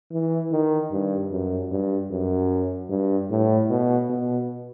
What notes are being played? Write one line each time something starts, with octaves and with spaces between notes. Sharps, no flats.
E3
D#3
G2
F#2
G2
F#2
G2
A2
B2
B2